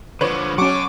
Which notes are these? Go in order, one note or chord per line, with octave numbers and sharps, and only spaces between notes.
D3 F3 B4 C#5 D6
F#3 C#4 F#5 A5 C#6 D6